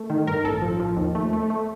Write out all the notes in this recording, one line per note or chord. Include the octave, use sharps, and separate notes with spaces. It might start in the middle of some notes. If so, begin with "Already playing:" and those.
Already playing: A3
D#3
G2 A#4
A1 A4
F3
F3
D#2
A3
A3
A3